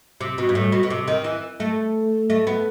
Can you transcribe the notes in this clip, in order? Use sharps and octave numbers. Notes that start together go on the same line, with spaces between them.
C3
B2
G2
A2
B2
B2
C3
D#3
E3
A3
A3
B3